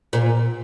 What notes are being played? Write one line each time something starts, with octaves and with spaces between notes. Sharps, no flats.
A#2